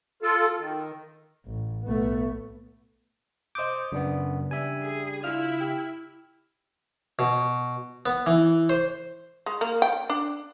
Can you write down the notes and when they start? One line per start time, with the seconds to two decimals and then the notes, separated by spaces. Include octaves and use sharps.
0.22 F4 A4
0.59 D#3
1.46 A1
1.86 B1 A3 B3
3.55 C5 D#5 D6 D#6 G6
3.92 F#2 C#3 B3 D4
4.51 G3 E5 G#5
4.82 G#4
5.24 E4 F4 F6
5.60 G4
7.19 B2
8.06 B3
8.26 E3
8.70 C5
9.46 G#3
9.61 A#3
9.82 G5
10.09 D4